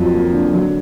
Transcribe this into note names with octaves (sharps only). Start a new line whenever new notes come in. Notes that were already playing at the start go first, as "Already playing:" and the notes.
Already playing: F2 F#3
A#3
D3
F#3